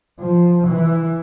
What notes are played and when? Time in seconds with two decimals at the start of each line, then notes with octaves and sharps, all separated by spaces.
0.20 F3
0.67 E3